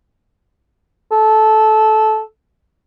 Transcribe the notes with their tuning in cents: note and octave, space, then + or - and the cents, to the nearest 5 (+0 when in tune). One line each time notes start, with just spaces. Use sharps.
A4 -15